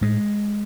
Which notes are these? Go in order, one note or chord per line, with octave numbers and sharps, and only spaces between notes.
A2 G#3